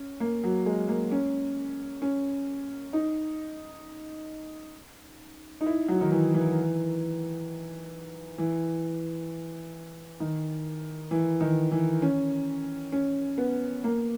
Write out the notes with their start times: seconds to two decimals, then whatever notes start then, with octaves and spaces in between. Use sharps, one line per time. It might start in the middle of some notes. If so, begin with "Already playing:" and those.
Already playing: C#4
0.20 A#3
0.44 F#3
0.66 G#3
0.88 A#3
1.11 C#4
2.02 C#4
2.93 D#4
5.61 D#4
5.66 E4
5.88 F#3
6.01 D#3
6.11 E3
6.34 E3
8.38 E3
10.20 D#3
11.11 E3
11.41 D#3
11.72 E3
12.02 C#4
12.92 C#4
13.38 B3
13.84 A#3